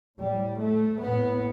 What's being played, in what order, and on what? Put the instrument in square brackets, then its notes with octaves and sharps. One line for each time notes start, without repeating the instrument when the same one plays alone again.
[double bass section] A2 G3
A3
A2 B3